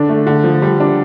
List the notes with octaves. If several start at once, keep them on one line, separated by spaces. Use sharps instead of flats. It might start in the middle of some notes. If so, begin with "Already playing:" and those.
Already playing: D3 D4
A3
D3
F3
G3
D4